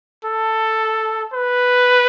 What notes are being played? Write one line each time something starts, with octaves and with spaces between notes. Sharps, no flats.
A4
B4